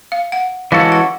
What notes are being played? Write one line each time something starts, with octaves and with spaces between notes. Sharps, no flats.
F5
F#5
E3 G#3 C#4 F#4 A4 F5
F#5